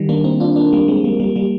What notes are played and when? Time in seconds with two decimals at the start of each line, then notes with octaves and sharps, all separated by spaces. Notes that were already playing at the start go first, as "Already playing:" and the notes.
Already playing: D#3 G3
0.09 A#3 D4
0.24 C4 D#4
0.40 D4 F4
0.56 A#3 D4
0.73 G3 A#3
0.88 G#3 C4
1.04 G3 A#3
1.20 G3 A#3
1.36 G3 A#3